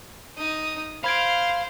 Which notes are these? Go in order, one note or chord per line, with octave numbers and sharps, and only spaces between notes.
D#4 D#6
C5 F5 B5 G#6 D7